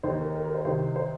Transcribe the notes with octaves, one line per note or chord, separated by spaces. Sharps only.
D#2 D#3 C5
A#4
A#4
A#4
C5
C2 C3 D#3 C5
C5